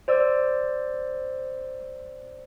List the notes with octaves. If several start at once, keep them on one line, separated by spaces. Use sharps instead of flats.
C5 D5 E6